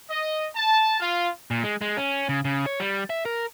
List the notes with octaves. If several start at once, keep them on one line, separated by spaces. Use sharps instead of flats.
D#5
A5
F4
A#2
G#3
G#3
C#4
C#3
C#3
C#5
G3
E5
A#4